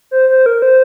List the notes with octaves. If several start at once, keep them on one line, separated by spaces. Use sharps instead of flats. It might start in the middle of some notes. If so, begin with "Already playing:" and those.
C5
C5
A#4
C5